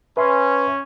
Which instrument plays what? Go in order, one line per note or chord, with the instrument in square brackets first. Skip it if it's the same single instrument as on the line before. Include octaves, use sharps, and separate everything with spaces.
[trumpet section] C#4 [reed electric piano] B4 E5 C6